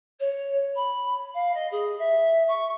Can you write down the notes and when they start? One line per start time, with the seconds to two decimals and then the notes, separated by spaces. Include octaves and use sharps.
0.20 C#5
0.75 B5
1.34 F5
1.54 D#5
1.71 G#4
1.99 E5
2.48 C#6